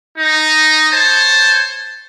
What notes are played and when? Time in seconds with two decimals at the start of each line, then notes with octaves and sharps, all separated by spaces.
0.18 D#4
0.92 C5 C#5 A5